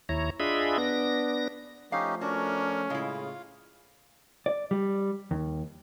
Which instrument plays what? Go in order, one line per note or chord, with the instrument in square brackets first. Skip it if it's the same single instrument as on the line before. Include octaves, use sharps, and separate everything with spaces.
[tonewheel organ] D#2 E4 C#5 A#5
D4 F4 G#4 D#5 E5 B5
B3 D4 A#6
[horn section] F3 A3 [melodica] C#4 D#4 G4 [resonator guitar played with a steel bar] F5
[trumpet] C#4 [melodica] D4 A#4 [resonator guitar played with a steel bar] F#4
[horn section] A2 C#3 [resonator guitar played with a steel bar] G#3 E4 [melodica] F4 F5
[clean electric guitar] D5
G3
D#2